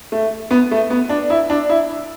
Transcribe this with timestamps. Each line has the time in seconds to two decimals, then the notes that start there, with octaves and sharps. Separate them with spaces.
0.12 A3
0.51 B3
0.71 A3
0.90 B3
1.09 D4
1.30 E4
1.50 D4
1.69 E4